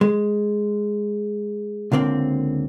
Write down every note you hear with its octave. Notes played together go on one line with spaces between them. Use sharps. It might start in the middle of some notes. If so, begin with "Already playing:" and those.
G#3
C#2 D3 A#3 C4